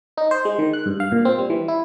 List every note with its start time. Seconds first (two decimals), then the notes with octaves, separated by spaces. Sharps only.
0.17 D#4
0.31 C5
0.45 G#3
0.59 D#3
0.73 F#6
0.86 G2
1.00 F5
1.12 A#2
1.25 C4
1.38 G3
1.50 E3
1.68 E4